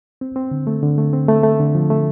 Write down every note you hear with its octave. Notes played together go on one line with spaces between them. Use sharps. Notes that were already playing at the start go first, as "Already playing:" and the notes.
C4
C4
D3
A3
D3
A3
C4
A3
A3
D3
F3
A3